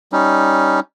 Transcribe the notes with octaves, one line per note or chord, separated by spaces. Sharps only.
G3 C#4 D#4